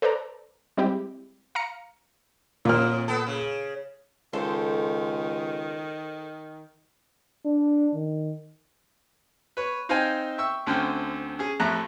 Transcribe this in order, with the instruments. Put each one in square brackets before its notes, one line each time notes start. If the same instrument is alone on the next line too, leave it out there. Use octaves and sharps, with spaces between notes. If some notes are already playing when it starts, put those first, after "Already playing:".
[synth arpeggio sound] A4 B4 C5 D5 A#5
G3 G#3 C4 E4 G4
F5 A#5 C#7
[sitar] F2 [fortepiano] A#2 F6
[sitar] B3 A4
C#3
[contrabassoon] C#2 [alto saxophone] D#3 [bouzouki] A4 C5
[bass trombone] D4
D#3
[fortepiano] B4 C#5
C4 D#4 C5 F5 G5 G#5
E5 G5 C#6 E6
D2 D3 C4 C#4 G5 F6
C#4 G#4
A1 F2 A2 A3 A#5 F#6